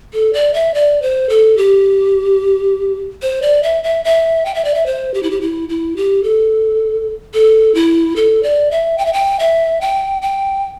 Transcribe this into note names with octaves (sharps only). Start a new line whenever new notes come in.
A4
D5
E5
D5
C5
A4
G4
C5
D5
E5
E5
E5
G5
E5
D5
E5
C5
G4
E4
G4
E4
E4
G4
A4
A4
E4
A4
D5
E5
G5
E5
G5
E5
G5
G5